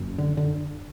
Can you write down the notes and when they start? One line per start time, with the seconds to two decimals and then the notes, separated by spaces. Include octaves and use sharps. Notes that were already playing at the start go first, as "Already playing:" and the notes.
Already playing: F#1 F#2
0.18 D3
0.37 D3